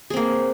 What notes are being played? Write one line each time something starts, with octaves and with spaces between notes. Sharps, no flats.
A#3 C4 G#4